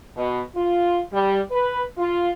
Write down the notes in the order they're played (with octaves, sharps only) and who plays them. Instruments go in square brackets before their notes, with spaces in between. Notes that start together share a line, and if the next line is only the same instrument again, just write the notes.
[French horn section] B2
F4
G3
B4
F4